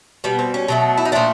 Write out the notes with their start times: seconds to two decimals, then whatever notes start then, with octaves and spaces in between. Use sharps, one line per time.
0.24 B2 G3 B3
0.39 C4
0.54 C#4
0.68 B2 F#3 A3
0.98 E4
1.05 D#4
1.12 A#2 F3 A3 D4